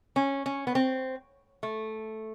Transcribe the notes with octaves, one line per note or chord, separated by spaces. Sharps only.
C#4
C#4
B3
C4
A3